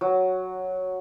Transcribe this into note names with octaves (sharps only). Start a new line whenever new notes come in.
F#3